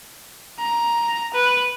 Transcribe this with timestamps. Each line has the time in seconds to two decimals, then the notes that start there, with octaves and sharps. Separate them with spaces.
0.59 A#5
1.34 B4